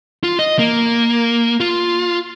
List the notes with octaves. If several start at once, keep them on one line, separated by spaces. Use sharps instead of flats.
F4
D#5
A#3
F4